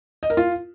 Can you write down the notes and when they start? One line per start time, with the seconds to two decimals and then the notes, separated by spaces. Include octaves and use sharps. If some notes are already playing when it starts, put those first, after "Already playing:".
0.23 D#5
0.30 A#4
0.37 F4